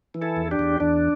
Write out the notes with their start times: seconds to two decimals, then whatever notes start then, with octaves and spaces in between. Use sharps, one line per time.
0.14 E3
0.22 E4 A4
0.37 E2
0.51 D4 G4
0.59 E2
0.80 E2 D4